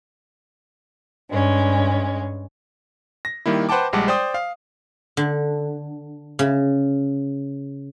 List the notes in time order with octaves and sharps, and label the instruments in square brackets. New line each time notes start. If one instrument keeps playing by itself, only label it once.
[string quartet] G2 G#3 C#4
[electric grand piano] A#6
D#3 G3 A#3 E4
B4 C5 F#5 G5 A5 D6
A#1 G3 G#3 F#5 A5 D6
C5 D5 G5 D#6
F5
[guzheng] D3
C#3